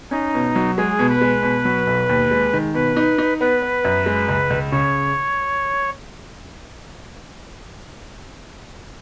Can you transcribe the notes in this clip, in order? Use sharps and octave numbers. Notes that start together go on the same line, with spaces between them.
C#4 D#4
B2
F#3
G#3 G#4
B2
B4
G#3
B2
F#3
B1
D#2
G#3
D#3
B2 B4
D#4
D#4
B3 B4
B3
F#2
G#3
C#2
C#2
C#3 C#5